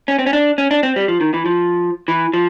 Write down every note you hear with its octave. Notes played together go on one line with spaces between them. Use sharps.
C#4
C4
C#4
D4
C#4
D4
C4
G3
F3
D#3
E3
F3
E3
F3